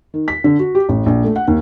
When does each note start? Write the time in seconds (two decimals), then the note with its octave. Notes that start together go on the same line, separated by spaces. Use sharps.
0.14 D#3
0.28 B6
0.44 D3
0.59 F#4
0.75 G4
0.89 A1
1.06 A#1
1.24 A3
1.36 F#5
1.48 D#2